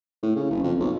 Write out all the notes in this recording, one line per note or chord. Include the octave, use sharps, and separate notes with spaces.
A2
C#3
F#1
F2
B1